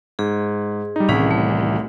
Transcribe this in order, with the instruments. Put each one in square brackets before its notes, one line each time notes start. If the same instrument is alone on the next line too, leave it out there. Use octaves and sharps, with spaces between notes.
[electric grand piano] G#2 [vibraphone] G#4
[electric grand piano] G3 D#4
[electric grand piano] C2 B6 [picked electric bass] A2 D#3 E3 [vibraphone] C#4 G#4
[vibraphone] A3